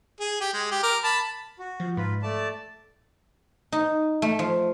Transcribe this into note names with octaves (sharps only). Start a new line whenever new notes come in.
G#4
G4
G#3
G4
A#4 D6
A5 B5
F#4
F3
G#2 F4 B4
A3 D5 A5
D#4
A3
F3